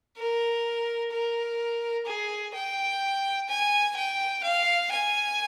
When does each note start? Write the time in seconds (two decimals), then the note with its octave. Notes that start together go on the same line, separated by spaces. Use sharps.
0.18 A#4
1.12 A#4
2.06 G#4
2.54 G5
3.49 G#5
3.96 G5
4.44 F5
4.91 G#5